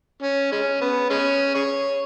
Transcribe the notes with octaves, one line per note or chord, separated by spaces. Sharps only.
C#4
G#3 C#4
B3
G#3 C#4
G#4 C#5